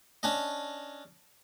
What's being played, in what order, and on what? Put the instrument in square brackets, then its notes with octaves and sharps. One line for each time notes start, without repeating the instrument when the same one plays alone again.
[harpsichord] C#4 D4 D#5